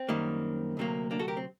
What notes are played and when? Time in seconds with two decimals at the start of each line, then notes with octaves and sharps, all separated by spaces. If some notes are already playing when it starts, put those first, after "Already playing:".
Already playing: C4
0.09 F#2 D#3 G3 A#3
0.77 D2 C3 F#3 A#3
1.11 A#3 D4
1.19 F#4 A4
1.28 G4 A#4
1.37 C4